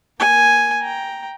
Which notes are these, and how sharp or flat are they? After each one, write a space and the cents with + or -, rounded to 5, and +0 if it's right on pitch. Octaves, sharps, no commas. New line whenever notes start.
A#3 +20 G#5 +0
G5 +0 A#5 +5